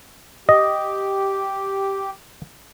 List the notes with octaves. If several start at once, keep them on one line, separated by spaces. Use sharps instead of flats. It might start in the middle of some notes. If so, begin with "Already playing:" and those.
G4 D#5